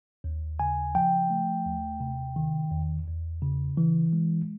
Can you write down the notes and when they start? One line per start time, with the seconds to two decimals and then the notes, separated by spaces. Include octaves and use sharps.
0.24 D#2
0.59 C#3 G#5
0.95 F3 G5
1.30 A3
1.66 D#2
2.00 C3
2.36 D#3
2.71 E2
3.07 E2
3.42 C#3
3.77 E3
4.13 G#3